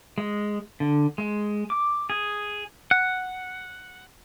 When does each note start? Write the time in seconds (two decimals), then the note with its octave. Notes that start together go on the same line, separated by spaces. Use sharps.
0.18 G#3
0.80 D3
1.18 G#3
1.70 D6
2.10 G#4
2.91 F#5